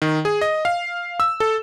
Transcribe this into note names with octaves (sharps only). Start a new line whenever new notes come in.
D#3
G#4
D#5
F5
E6
A4